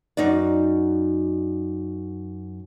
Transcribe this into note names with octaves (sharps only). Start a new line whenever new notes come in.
F#2 D#4 F#4 D5